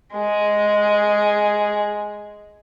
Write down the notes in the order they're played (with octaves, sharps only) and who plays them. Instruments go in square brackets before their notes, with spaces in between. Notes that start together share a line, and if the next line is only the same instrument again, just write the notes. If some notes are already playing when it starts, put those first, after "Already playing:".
[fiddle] G#3 G#4